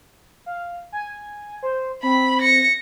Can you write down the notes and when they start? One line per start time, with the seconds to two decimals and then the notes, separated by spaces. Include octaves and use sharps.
0.46 F5
0.92 G#5
1.63 C5
2.03 C4 B5
2.42 A#6 C#7